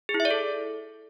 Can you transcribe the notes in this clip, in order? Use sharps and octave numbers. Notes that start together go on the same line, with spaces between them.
G#4
E4
E5
D5
A4